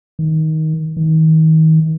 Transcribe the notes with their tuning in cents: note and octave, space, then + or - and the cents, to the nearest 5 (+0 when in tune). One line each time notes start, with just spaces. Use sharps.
D#3 +15
D#3 +35